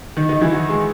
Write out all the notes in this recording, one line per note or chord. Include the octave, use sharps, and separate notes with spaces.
D#3 D#4
D#3 D#4
E3 E4
F#3 F#4
G#3 G#4